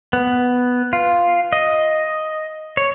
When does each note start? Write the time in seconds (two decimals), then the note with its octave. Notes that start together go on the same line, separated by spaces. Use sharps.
0.13 B3
0.93 F4
1.53 D#5
2.77 C#5